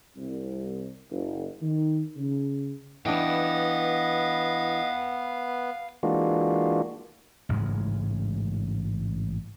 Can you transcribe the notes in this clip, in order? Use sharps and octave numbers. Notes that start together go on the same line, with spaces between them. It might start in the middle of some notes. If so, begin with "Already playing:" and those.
C2
F#1
D#3
C#3
E3 B3 D4 B4 D#5 F5 G5
E3 G#3 A#3 D4 F4 F#4
A1 G#2 C#3 G#3